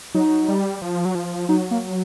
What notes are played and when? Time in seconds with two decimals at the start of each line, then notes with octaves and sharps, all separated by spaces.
0.14 F#3 D#4
0.49 G3
0.82 F3
1.05 F#3
1.15 F3
1.49 F#3 D#4
1.71 A#3